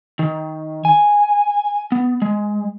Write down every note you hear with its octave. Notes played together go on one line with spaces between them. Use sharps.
D#3
G#5
B3
G#3